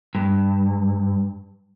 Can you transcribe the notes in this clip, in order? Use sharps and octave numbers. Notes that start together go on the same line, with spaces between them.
G2